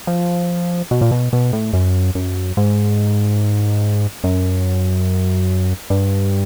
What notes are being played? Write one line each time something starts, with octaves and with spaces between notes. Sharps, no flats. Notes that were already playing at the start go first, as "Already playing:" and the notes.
F3
B2
A#2
B2
B2
A2
F#2
F#2
G#2
F#2
G2